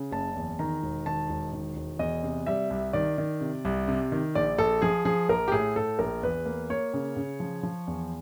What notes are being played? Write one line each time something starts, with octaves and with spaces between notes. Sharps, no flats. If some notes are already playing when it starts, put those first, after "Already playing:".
Already playing: C#3
F#1 A5
E2
D#3 A#5
E1
D#3 A5
E1
D#3
E1
E2 D#5
C3
G3 E5
C2
D#3 D5
D#3
C3
C2
C3
D#3
A#1 D5
A#1 A4
F3 G#4
F3 G#4
A#1 A#4
G4
A2 G#4
A2 A4
A#1 A#4
E2 B4
A#3
A#3 C#5
C#3
C#3
F3
F3
E2